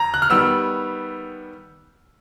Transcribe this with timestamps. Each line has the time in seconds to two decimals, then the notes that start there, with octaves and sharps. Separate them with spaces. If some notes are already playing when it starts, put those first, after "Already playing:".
Already playing: F2 A#5
0.14 F#6
0.22 F6
0.30 D#3 G3 B3 E6